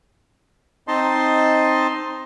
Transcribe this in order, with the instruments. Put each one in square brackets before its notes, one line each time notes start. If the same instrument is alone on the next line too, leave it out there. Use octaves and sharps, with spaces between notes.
[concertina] C4 D#4 D#5 A5 C6